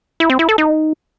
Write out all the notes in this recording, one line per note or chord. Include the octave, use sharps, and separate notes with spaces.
E4
C4
E4
A4
D#4